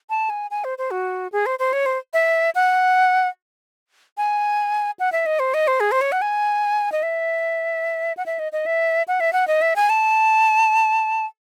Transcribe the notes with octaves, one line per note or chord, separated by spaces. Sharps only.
A5
G#5
G#5
C5
C5
F#4
G#4
C5
C5
C#5
C5
E5
F#5
G#5
F#5
E5
D#5
C5
D#5
C5
G#4
C5
C#5
F#5
G#5
D#5
E5
F#5
E5
D#5
D#5
E5
F#5
E5
F#5
D#5
E5
G#5
A5